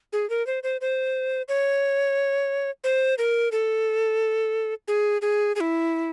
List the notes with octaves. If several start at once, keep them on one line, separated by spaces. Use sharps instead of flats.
G#4
A#4
C5
C5
C5
C#5
C5
A#4
A4
G#4
G#4
G#4
E4